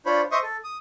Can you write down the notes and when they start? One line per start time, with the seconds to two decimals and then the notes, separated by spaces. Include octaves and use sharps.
0.06 D4 F4 C5 C#5 B5
0.32 C5 D#5 E5 C6 C#6 D#6
0.43 A4
0.64 D#6